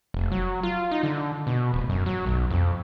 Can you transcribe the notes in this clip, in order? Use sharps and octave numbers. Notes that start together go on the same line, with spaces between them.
F1
F#3
F4
D#4
D3
B2
D1
F#2
F#3
B1
F2